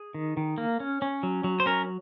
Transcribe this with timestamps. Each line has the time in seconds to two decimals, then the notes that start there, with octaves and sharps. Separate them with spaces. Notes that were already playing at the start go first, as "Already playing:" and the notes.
Already playing: G#4
0.14 D#3
0.37 D#3
0.58 A#3
0.80 C#4
1.02 C#4
1.23 F#3
1.44 F#3
1.60 C5
1.66 C#4 A#4